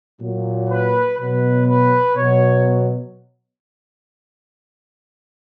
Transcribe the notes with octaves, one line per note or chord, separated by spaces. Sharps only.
A#2 F#3
B4
B2 F#3 B4
B4
B2 F#3 C#5